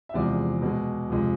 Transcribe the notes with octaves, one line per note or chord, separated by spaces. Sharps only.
E5
E2 C3 F3 G#3 D5
B2 G#3
F2 C3 F3 G#3